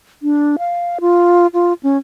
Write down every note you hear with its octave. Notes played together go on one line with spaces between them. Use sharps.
D4
F5
F4
F4
C#4